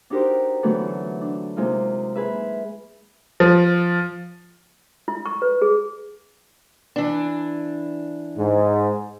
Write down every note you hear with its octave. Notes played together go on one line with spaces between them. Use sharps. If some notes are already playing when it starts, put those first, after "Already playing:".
D4 D#4 F#4 G4 A#4 C5
D3 E3 F#3 A3 B3 D4
D4
C3 G#3 A#3 D#4 F4
G#4 B4 E5
F3
E4
C#6
B4
G#4
E3 D4
G#2